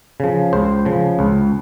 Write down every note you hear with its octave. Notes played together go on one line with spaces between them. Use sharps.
C#3 F3
C#2 C5
C#3 F3
C#2